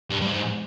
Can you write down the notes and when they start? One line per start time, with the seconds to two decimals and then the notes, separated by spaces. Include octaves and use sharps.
0.10 G2
0.22 G2
0.27 G#2